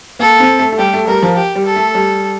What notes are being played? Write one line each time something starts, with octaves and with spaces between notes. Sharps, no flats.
A#3 A4
C4
A3
A3
G3 G4
A3
G3 A#4
F3
G4
G3
A4
A3
G3